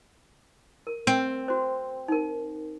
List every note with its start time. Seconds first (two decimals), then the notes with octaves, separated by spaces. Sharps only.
0.87 A#4
1.07 C4
1.48 F#4 C5
2.08 D#4 A#4